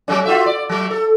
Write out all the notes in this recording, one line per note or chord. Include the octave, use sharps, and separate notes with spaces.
F#3 A3 C#4
F4 F#4 E5
D5
F#3 A3
A4